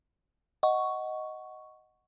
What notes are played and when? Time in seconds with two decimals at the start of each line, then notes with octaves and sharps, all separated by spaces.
0.63 D#5 F#5 C#6